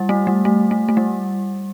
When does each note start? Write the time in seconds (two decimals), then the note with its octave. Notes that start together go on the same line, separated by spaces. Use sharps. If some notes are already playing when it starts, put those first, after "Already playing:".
Already playing: G3
0.09 A3
0.27 G3
0.45 A3
0.71 A3
0.89 A3
0.97 G3